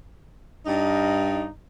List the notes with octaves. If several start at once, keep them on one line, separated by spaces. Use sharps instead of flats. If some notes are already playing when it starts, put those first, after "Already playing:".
G2 D#4